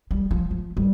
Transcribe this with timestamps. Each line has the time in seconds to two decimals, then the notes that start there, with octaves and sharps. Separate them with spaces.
0.11 G3
0.31 F3
0.51 F3
0.77 G3